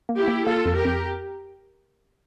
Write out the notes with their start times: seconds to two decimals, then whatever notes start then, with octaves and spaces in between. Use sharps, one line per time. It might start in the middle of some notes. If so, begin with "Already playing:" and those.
0.09 A#3
0.18 E4 G4
0.28 A#3
0.47 A#3 F4 A4
0.65 F2
0.76 G4 A#4
0.85 F2